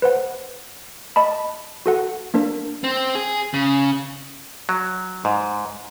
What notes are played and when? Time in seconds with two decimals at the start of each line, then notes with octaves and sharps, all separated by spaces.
0.02 B4 C5 F#5
1.16 D#5 A5 B5
1.86 F#4 A4 F#5
2.34 A#3 D4 A#4
2.84 C4
3.15 G#4
3.54 C#3
4.69 F#3
5.25 G#2